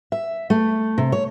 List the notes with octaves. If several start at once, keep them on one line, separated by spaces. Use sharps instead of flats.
E5
A3
C3
C#5